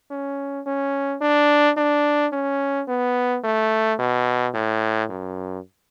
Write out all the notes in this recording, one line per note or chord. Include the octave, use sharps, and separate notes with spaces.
C#4
C#4
D4
D4
C#4
B3
A3
B2
A2
F#2